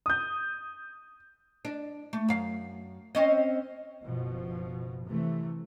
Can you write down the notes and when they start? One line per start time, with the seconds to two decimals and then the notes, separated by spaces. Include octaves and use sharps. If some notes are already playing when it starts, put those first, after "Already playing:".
0.06 D#6 G6
1.65 D4
2.13 A3
2.28 F#2 F5
3.15 C4 C#4 D#5
4.02 F#1 B2 F3
5.03 C3 E3 A3